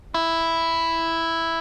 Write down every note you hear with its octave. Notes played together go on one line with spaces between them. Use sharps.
E4